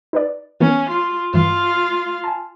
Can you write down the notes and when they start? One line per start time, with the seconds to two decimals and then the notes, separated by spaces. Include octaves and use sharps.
0.13 D#4 B4 D5
0.61 E3 A#3 B3 C#4
0.90 F4
1.34 G2 E3 F4 F5
2.24 G#5 A5